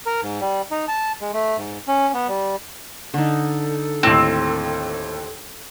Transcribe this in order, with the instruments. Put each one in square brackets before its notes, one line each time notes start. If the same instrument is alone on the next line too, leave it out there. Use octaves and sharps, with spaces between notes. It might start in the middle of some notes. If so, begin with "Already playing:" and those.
[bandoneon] A#4
G#2
G3
D#4
A5
G#3
A3
G#2
C#4
B3
G3
[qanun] D3 D#4 [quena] A4
[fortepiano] D#2 A2 [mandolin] C4